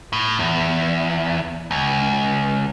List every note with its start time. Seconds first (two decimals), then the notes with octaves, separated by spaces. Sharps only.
0.13 A2
0.39 E2
1.71 C#2